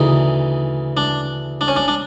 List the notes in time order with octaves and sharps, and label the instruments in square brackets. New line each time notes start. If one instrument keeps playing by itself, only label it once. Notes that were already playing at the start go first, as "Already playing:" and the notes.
Already playing: [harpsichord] D2 C#3 E3 D#4
D4
D4
C#4
D4
D4